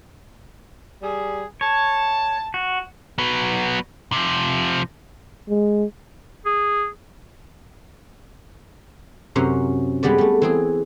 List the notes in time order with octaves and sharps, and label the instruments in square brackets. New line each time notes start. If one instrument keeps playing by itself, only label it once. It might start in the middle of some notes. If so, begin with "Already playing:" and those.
[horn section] G3 G#4
[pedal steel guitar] C#5 [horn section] A5
[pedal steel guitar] F#4
[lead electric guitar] F#3 B3
C3 F3
[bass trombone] G#3
[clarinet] G#4
[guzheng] F#2 C3 C#4 C5 F#5 A#5
G3 G#3 B3 B4 D5
G3 A3
E3 C4 G#4